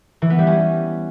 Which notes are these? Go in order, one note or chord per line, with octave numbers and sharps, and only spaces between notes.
E3
B3
G3
C#4